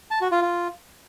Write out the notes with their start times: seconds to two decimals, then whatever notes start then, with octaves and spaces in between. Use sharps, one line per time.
0.11 A5
0.21 F#4
0.32 F4
0.42 F4